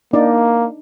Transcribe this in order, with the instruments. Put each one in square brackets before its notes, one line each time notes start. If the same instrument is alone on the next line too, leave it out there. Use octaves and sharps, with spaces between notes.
[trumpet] A#3 [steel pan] D4 D#4 D5